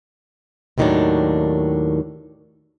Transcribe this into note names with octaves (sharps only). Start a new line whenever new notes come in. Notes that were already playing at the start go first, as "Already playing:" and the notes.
D#2 A2 D#3 E3 F#3 D4